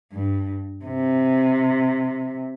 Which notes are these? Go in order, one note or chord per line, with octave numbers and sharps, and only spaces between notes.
G2
C3